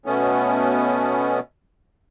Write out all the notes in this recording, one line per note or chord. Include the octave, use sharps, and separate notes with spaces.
B2 A3 B3 C#4